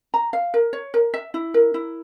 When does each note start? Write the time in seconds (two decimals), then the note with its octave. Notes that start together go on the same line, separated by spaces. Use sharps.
0.14 A#5
0.33 F5
0.54 A#4
0.73 C#5
0.94 A#4
1.14 E5
1.34 E4
1.54 A#4
1.74 E4